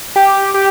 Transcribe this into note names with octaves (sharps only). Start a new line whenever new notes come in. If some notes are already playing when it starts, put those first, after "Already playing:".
G4
G4